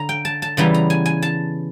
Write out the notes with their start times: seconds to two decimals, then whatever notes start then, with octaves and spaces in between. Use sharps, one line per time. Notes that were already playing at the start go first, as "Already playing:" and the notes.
Already playing: D3 A#5
0.09 G5
0.25 A5
0.42 A5
0.57 C#3 E3 G3 B3 A#5
0.74 A#5
0.90 G#5
1.06 G#5
1.22 A5